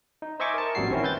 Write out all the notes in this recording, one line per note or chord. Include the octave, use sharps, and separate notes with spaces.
D#4
C5 D#5 E5 G#5 C#6 D6
A#4 A5
A1 F2 A#2 G3 F#4 C7
D#3 C4 C#4 E4
B4 G6 A6